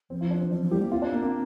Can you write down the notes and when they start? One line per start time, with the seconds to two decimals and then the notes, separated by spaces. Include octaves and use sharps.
0.10 F3 C4
0.21 F4
0.31 D4
0.41 C4
0.51 F3 D4
0.62 F3
0.71 G3 G4
0.82 A#3
0.92 C4 F4
1.02 D4
1.12 A#3
1.23 A#3